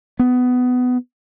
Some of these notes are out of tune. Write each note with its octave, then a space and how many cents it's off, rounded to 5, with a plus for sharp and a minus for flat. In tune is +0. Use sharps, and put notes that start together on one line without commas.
B3 +20